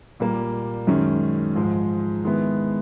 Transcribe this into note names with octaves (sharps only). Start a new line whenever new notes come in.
A#2 G3 A#3
F#2 D#3 G#3 C#4
G#2 F3 G#3
D#3 G#3 B3 E4